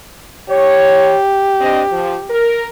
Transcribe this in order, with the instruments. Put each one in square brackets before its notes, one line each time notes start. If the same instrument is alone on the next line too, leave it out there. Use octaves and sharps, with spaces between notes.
[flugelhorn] G4 [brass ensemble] C#5
[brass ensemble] C4 D4 D#5
F3
A#4